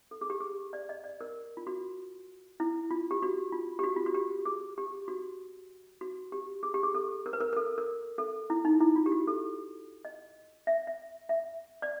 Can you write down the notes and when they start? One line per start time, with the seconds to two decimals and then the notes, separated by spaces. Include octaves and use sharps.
0.11 A4
0.21 G#4
0.30 G4
0.40 G#4
0.73 D5
0.89 D#5
1.04 D5
1.21 A#4
1.57 F4
1.67 F#4
2.60 E4
2.91 F4
3.11 G4
3.22 F#4
3.52 F4
3.79 G4
3.83 F#4
3.96 F4
4.06 F#4
4.14 G4
4.45 G#4
4.78 G4
5.08 F#4
6.01 F#4
6.32 G4
6.63 G#4
6.74 G4
6.83 G#4
6.95 A4
7.26 A#4
7.33 B4
7.40 A#4
7.53 A#4
7.56 A4
7.78 A#4
8.18 A4
8.50 E4
8.65 D#4
8.80 E4
8.96 F4
9.06 G4
9.12 F#4
9.27 A4
10.05 D#5
10.67 E5
10.87 E5
11.29 E5
11.82 D5